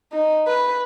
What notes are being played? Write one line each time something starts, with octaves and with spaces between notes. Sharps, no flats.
D#4
B4